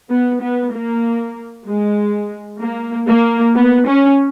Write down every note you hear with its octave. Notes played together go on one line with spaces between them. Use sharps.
B3
B3
A#3
G#3
A#3
A#3
B3
C#4